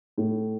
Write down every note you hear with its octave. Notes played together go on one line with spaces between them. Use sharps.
A2